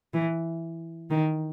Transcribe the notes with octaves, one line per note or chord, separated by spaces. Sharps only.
E3
D#3